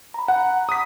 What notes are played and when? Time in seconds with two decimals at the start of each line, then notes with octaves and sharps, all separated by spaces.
0.14 A#5 B5
0.28 F#5
0.69 D#6 B6